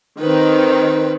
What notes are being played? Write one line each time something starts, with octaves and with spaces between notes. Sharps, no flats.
D#3 C4 B4